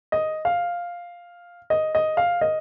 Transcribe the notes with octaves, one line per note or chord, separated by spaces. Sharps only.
D#5
F5
D#5
D#5
F5
D#5